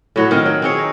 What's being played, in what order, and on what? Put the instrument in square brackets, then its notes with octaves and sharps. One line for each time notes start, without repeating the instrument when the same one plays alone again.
[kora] A2 F#3 F#4
D#3 C4 F4
F#3
C4 G#4 C#5
D#4